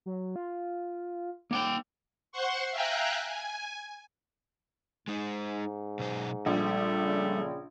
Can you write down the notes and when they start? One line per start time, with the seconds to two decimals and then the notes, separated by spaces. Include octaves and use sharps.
0.06 F#3
0.36 F4
1.51 A#3 F#5 G5 D6
2.32 C5 F#5 C6 C#6
2.71 E5 F5 G5 G#5 A#5 F#6
3.27 G#5
5.08 G#2 G#3 D#4
5.99 B2 F#3 C5
6.46 A#1 G3 A3
7.01 C#3